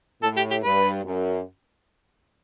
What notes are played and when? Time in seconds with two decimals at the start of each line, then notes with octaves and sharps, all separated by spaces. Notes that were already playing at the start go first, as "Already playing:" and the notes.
0.23 A2 A4
0.37 G4
0.50 G4
0.64 G2 B4
1.04 F#2